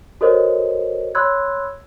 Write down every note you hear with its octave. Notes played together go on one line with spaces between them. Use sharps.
F#4 A4 A#4 C5 C#5 D#5
C#5 B5 C6 E6 F#6 G#6